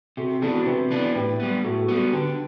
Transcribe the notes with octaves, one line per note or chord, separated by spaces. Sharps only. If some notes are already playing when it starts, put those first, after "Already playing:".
C3 F#4 A4
E3 B3 D4 F#4 A4
F#4 A4
C3 G4 B4
E3 B3 D4
A2 G4 B4
G3 B3
A2 F#4 A4
F#4 A4
G3 B3
F#4 A4
D3 G4 B4